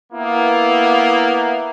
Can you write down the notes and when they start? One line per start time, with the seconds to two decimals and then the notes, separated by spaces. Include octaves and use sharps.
0.12 A#3 B3 E4